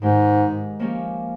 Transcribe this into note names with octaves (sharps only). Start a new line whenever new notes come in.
G#2 D#3 G#3 D#4 G4
F3 A#3 C#4 G4